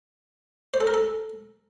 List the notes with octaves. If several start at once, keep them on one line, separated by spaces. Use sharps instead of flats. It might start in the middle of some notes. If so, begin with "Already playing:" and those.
C5
A4
A#4
A4